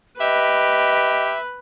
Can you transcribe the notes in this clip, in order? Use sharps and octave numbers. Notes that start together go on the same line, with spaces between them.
G4 B4 D#5 E5